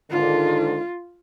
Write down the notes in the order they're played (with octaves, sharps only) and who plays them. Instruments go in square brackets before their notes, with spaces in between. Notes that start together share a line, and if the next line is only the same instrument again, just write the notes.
[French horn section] G#2 D3 D#3 [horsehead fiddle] F4